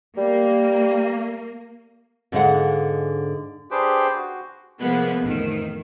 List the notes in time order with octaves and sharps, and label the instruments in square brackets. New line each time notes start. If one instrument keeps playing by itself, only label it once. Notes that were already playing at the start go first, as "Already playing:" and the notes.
[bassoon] G3 [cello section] A#3
[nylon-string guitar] G#2 D3 G#3 D#5 F5 F#5
[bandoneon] D4 G4 G#4 B4 C5 G5
F#4
[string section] C3 F3 G#3 A#3 B3
A1 F2 D#3